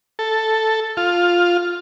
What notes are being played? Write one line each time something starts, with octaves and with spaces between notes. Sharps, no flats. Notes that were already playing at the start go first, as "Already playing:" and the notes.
A4
F4